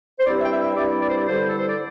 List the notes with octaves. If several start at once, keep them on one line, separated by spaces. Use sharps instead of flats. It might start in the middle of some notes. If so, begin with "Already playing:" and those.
C5
G2 G3 C4 E4 D5
E5
G5
E5
E5
G2 G3 C4 E4 D5
D5
C5
D5
G2 D3 G3 E4 C5
A4
C5
D5